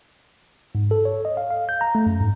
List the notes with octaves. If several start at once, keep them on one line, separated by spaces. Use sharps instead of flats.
G#2
A4
C#5
D#5
F5
F5
G6
A#5
A3
F#2
G#2